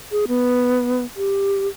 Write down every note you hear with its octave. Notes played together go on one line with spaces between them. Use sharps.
G#4
B3
G4